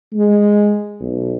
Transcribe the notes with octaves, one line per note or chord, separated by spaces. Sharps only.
G#3
B1